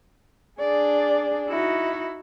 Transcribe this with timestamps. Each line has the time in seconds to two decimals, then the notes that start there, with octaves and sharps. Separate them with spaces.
0.59 D4 G#4 D5
1.49 D#4 E4 F#4